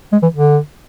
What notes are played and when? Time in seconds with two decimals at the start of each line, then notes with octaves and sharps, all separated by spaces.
0.12 G#3
0.22 E3
0.34 D3